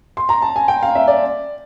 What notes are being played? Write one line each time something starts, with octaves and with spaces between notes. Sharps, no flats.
C6
A#5
A5
G#5
G5
F5
E5
D5